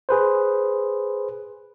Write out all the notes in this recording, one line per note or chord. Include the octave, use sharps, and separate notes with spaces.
G#4 B4 C5